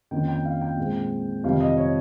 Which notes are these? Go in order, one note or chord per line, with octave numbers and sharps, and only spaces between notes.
F2 D#3 A#3 C#4 G5
G5
F5
G5
A#2 G#3 C4
F2 C3 D#3 G3 F5
D#5
C#5